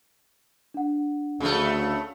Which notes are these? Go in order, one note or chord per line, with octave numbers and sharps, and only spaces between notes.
D4 F#5
D2 C#3 A3